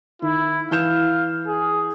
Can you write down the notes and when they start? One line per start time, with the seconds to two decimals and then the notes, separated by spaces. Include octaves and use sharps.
0.22 D#3 E4
0.71 E3 F5 G6 E7
1.47 G#4